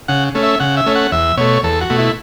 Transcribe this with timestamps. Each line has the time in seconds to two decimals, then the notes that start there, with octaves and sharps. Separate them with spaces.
0.08 C#3 F#5
0.35 A3 C#4
0.43 E5
0.60 C#3 F#5
0.77 E5
0.86 A3 C#4
0.95 F#5
1.12 E2 E5
1.38 B2 A3 C#5
1.63 E2 A4
1.81 F#4
1.90 B2 A3
1.98 E4